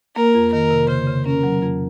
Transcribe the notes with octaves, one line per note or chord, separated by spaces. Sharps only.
A#3 A#4
F2
D#3 A#4
C3
C#3 C5
C#3
C#4 A#4
F#3
F2